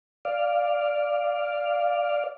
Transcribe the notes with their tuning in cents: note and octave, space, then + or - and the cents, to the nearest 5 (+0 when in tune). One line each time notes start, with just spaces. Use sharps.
D5 +0 F5 +0